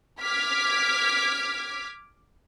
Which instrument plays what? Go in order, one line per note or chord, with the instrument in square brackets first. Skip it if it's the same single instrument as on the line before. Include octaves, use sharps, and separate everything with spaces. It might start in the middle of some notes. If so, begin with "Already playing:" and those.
[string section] D6 F6 G#6 B6